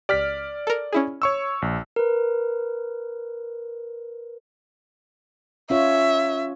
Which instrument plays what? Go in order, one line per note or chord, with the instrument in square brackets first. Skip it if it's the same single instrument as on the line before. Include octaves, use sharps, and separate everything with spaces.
[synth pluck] C#2 G4 [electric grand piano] D5 F6 B6
[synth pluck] A4 A#4
C#4 E4 G#4
[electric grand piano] C#5 C#6 E6
A#1
[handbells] A#4 B4
[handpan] C#4 F4 C#5 [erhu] E5